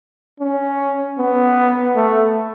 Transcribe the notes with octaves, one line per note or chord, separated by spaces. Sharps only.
C#4
B3
A3